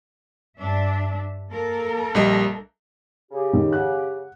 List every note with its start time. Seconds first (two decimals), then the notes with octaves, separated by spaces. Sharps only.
0.58 G2 D4 E5
1.51 A#3 A4 A#4
2.15 A#1 G3 D#5
3.31 C#3 G4
3.53 D#3
3.72 F#5 F#6